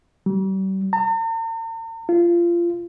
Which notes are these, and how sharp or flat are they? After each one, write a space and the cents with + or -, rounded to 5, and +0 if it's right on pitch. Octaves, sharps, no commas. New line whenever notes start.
G3 -40
A#5 -45
F4 -25